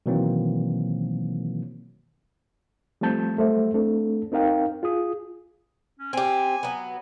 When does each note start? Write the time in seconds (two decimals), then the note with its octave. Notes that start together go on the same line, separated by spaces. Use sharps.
0.06 B2 D#3 E3 F#3 A#3 C4
3.01 F3 G3 A3 C4 A5 G6
3.37 F#3 G3 A3 A4 C5 E5
3.74 A3 C4 D4 A4
4.32 C4 D#4 A#4 F5 G5
4.83 F4 G#4 D#6
5.99 C#4
6.13 C4 G4 G#5
6.63 F#3 B3